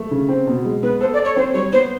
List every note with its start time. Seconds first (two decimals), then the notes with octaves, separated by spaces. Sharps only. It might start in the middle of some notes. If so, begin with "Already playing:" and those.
Already playing: A3
0.11 C#3
0.29 C4
0.47 B2
0.65 G#3
0.83 B3 B4
1.01 A4 C5
1.13 D5
1.19 A4
1.25 C#5
1.36 C4 C5
1.54 G3 C#5
1.72 B3 C5